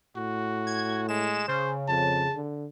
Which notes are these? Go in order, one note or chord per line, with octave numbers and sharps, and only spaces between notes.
A2 F#4
G#6
G#3 E7
C#3 C5
F2 A5
D3